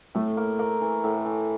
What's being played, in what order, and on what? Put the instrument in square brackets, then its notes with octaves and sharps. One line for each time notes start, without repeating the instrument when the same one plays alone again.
[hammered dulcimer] A2 [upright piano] A3
[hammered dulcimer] A#3
A#3
E3
A2
E3